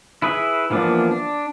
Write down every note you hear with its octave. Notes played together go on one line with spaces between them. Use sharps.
E4 G#4 B4 E5
E3 F3 A#3 B3 D4
D4